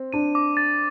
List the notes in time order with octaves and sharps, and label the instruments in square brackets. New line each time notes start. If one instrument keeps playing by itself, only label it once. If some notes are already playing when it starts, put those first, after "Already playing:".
Already playing: [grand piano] C4
[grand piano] D4 [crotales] D#7
[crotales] D6
A6